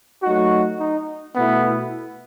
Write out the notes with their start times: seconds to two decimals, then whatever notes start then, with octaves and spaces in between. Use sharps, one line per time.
0.22 F#3 A3 D#4 F#4
0.80 D#4
1.35 B2 A3 B3 E4